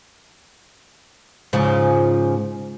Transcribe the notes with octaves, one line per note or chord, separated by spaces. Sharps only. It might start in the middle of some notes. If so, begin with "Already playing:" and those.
G#2 C#3 F3